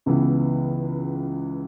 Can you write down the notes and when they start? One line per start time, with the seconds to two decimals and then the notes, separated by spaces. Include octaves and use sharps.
0.06 C#2 C#3 E3 B3